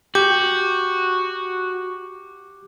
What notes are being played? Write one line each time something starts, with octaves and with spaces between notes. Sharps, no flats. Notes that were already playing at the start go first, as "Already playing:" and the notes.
F#4 G4 D6 G6